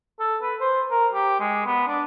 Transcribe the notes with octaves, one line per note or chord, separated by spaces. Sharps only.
A4
B4
C5
A#4
G4
G#3
B3
D4